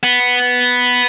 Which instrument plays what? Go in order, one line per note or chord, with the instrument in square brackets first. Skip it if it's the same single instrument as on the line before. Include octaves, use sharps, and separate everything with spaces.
[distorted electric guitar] B3